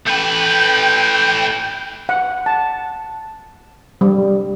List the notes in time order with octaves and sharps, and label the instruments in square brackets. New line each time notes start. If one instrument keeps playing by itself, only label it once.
[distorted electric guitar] A3 B4 [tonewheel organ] G5
[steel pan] F#5
A5
G3